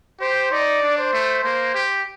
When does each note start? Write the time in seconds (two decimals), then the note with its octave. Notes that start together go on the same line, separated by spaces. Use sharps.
0.21 G4 C5
0.52 D#4 D5
0.83 D4
0.98 C5
1.13 A3
1.44 A#3 C5
1.75 G4